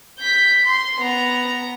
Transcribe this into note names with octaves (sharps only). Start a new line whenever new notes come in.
G6 B6
C6
B3 A#5